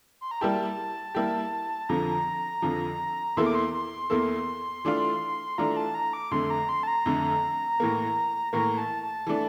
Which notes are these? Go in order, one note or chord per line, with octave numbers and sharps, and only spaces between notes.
C6
A#5
G3 A#3 E4 G4 A5
G3 A#3 E4 G4
F2 D3 F3 A#5
F2 D3 F3
E2 E3 A#3 E4 A4 C6
D6
C6
C6
E2 E3 A#3 E4 A4
E3 A3 D4 F4
E3 A3 D4 F4 A#5
A5
A#5
D6
F2 D3 A3 C6
A#5
C6
A5
A#5
F2 D3 A3
A2 E3 A#3
A2 E3 A#3 A#5
A5
A5
E3 A3 D4